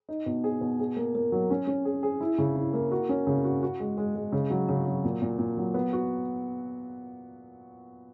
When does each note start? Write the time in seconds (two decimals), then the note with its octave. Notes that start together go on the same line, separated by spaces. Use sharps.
0.09 D#4
0.26 B2
0.44 G#4
0.61 B2
0.79 G#4
0.97 A#3
1.15 A#3
1.32 F#3
1.50 C#4
1.67 C#4
1.85 G#4
2.03 G#4
2.21 E4
2.38 C#3
2.55 E4
2.73 A#3
2.91 F#4
3.09 C#4
3.27 C#3
3.44 F#4
3.63 F#4
3.80 G#3
3.97 G#3
4.16 G#3
4.32 C#3
4.50 F#3
4.69 C#3
4.86 F#3
5.04 A#2
5.22 A#2
5.39 A#2
5.57 F#3
5.74 B3
5.93 F#4